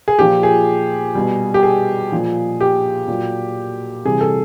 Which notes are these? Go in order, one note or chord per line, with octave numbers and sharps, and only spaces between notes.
G#4
A#2 F3 G4
G#4
B2 G3
G4
G#4
A#2 F3
G4
A#2 F#3
C3 E3 G3 G#4
A4